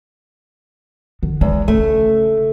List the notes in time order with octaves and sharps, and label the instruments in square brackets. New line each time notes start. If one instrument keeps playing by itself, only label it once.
[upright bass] D3
[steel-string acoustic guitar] E2 [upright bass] G#3
[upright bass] C#3 [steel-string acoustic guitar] A3